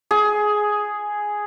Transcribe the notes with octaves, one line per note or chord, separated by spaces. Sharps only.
G#4